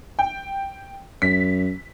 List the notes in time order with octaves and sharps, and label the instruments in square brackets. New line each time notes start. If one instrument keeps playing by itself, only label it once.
[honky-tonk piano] G5
[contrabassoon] F#2 [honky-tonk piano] B6